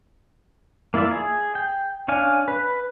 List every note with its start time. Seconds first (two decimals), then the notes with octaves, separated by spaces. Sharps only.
0.94 A#3 E4 F4 D5 E5
1.11 G#4
1.55 G5
2.08 C#4 D4 F5 G#5
2.48 B4